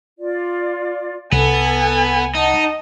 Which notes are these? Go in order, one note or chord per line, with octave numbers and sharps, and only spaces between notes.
F4 D5
C2 B3 A4 G#5
D#4 D#5 F#5 A5